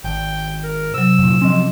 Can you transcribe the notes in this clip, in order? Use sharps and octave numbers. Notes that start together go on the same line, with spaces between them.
G#1 G5
A#4
C3 F#3 E6
F2 A#2
F3 C4 C#4 D#5 C6